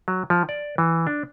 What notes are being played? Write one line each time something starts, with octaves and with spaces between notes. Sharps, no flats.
F#3
F3
D5
E3
D4